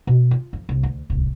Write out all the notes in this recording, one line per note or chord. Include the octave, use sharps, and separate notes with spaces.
B2
F4
F2
C2
D2
D1 C2